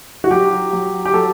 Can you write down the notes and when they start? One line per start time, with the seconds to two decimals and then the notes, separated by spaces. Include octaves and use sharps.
0.24 F#4
0.31 F#3 G4
0.73 F#3
1.05 G4
1.14 F#3 A4